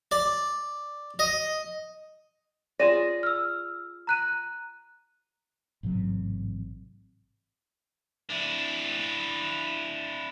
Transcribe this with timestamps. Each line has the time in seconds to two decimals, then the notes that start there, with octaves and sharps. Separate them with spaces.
0.11 D5
1.19 D#5
2.80 F4 G#4 D5 A#6 D#7 E7
3.23 E6 F6
4.07 A#5 F#6 D#7
5.83 A1 G#2 C3 F#3
8.30 D4 E4